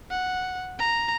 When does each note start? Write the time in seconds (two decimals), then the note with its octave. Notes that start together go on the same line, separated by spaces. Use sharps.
0.11 F#5
0.79 A#5